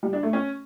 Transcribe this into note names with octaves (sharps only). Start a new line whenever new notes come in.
G3
D4
A3
C#4